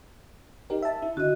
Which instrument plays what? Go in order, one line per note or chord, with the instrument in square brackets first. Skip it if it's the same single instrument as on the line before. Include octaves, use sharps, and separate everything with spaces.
[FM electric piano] D#4 G4 A#4
E5 A5
E4
[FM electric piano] D3 [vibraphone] F#4 D#5